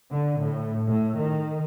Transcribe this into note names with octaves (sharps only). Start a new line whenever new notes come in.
D3
A2
A2
D#3